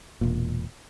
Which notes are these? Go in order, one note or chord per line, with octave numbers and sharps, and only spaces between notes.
E1 A#2